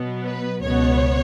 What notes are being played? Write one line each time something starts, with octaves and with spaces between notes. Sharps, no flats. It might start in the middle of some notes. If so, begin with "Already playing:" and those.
Already playing: B2 F#3 B3
B4
C#2 B2 B3 C#5